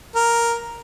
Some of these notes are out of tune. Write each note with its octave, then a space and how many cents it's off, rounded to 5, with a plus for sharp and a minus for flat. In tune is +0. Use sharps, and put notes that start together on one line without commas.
A#4 +0